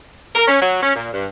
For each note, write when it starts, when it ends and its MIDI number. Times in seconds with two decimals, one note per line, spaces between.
0.35 0.47 70
0.48 0.60 61
0.61 0.80 54
0.83 0.90 61
0.95 1.08 46
1.12 1.27 43